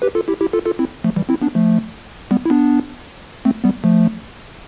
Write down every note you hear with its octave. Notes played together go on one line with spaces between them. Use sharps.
G4 B4
F4 A4
E4 G4
E4 G4
F4 A4
F4 A4
C4 E4
F3 A3
E3 G3
C4 E4
B3 D4
F3 A3
G3 B3
E4
B3 D4
A3 C4
G3 B3
F3 A3